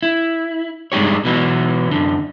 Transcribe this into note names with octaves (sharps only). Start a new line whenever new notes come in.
E4
G2 G#3 D#4 G4 C#5
B2 E3 F#3 B3
F#2 D3